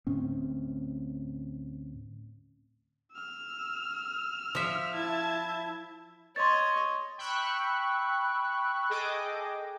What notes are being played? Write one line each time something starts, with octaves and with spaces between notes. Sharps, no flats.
D2 A2 C4 C#4
E6 F6
F3 E5
E4 A5 G#6
C#5 D#5 C6 A6
G5 B5 C#6 E6 F#6
G#4 A4 D#5 G5 D6